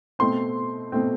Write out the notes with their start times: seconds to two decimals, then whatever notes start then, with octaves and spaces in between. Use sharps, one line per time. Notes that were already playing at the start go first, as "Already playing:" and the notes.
0.19 B2 A3 C4 C6
0.92 B2 A3 C4